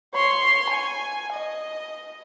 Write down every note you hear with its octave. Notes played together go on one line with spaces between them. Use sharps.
C#5 C6
G#5
D#5